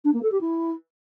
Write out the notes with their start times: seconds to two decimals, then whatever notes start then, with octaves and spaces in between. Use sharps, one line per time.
0.05 D4
0.14 A#3
0.23 A4
0.32 G4
0.41 E4